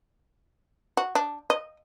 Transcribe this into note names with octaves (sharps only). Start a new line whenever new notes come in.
F#4
D4
D#5